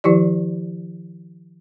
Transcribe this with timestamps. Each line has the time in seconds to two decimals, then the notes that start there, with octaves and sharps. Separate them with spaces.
0.04 D#3 F3 E4 G4 D5